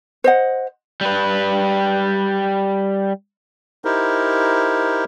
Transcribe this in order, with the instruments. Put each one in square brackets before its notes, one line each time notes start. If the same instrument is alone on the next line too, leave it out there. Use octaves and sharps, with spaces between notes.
[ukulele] C5 D#5 F#5
[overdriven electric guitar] G3 B4
[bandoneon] D#4 E4 G4 A#4 C5